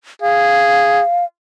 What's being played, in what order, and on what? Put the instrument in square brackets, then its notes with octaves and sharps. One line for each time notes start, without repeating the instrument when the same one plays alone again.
[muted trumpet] G#4 [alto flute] F5